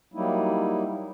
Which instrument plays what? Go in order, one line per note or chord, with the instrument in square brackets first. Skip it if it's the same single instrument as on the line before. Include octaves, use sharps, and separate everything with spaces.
[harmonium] F#3 G3 A#3 D#4 E4